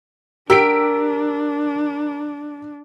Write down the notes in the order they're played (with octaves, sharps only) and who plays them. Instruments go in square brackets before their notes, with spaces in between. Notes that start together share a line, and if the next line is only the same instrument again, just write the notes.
[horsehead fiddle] D4 [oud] G4 [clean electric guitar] A#4 [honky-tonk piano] E6 B6 D7